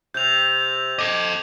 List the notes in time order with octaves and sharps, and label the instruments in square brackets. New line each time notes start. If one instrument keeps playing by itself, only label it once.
[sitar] C3 [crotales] G6 F7
[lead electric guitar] A4 D#5 [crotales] D6 G#6